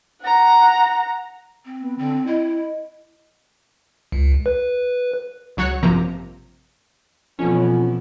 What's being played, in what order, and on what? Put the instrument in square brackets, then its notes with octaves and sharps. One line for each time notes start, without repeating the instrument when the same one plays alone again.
[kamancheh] F#5 A#5
[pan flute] C4
[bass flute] B3
[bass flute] D3 [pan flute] C4
[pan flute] E4 [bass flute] D#5
[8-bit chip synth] C#2
B4
[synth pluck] C#2 F#3 F#4 C#5 F#6 C#7
A1 G2 C3 F3 A#3 A#5
[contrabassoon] F2 [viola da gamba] B2 E3 F3 [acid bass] C#4